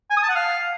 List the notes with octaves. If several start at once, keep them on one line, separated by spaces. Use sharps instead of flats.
G#5
D#6
A5
F#5
F5